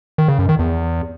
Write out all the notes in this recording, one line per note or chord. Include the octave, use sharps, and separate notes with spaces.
D#3
C#3
F#2
D#3
E2